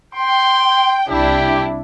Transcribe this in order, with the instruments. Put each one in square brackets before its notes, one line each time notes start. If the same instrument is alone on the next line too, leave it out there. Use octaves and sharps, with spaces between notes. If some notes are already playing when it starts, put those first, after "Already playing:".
[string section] G5 [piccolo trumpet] C6
[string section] C2 D4 E4 [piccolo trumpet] G4